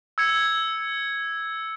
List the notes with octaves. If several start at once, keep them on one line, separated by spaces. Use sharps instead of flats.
E6 G#6 C#7